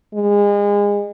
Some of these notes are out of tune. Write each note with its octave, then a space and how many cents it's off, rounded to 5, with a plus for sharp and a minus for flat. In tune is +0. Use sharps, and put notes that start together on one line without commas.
G#3 -30